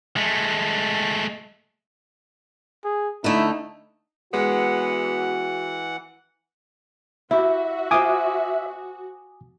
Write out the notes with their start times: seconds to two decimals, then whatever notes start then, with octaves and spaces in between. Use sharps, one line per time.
0.16 G#3 A3
2.84 G#4
3.24 D3 A3 D#4 E4
4.33 E3 G#3 B3 F#4 F#5
7.31 E4 F#4 G4 E5
7.91 F4 C5 G#5 D6 D#6